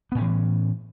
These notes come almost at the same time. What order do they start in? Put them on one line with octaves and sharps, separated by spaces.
B3 A2 C#4 E3